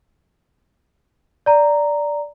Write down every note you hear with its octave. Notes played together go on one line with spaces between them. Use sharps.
D5 A#5